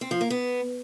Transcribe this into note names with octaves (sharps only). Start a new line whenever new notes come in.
C4
F3
A#3
B3